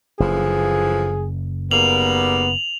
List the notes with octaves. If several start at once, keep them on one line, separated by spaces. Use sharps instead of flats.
F#1 D3 E3 F3 G#4
G#2 G3 A#3 B3 F7 F#7